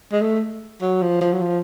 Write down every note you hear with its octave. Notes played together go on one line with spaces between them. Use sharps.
G#3
A3
F#3
F3
F3
F#3
F3